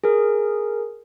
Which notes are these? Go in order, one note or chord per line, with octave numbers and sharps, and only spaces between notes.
G#4 A#4